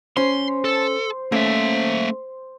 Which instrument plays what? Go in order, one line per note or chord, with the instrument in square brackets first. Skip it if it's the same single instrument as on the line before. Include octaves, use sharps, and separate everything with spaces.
[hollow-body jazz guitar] C#4 [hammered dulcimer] C5 [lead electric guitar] C6
[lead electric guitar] A4
[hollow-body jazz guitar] A3 C#4 [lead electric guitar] A#3 E5